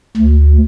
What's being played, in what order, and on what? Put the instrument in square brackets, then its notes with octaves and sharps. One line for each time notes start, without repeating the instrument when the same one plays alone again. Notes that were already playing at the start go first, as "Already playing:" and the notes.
[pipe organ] D2